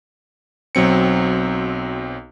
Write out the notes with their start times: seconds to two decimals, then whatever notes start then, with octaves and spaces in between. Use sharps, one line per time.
0.75 B1 F#3 C4 C#7